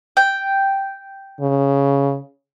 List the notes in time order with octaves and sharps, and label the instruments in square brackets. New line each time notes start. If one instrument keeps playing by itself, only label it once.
[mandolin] G5
[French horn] C#3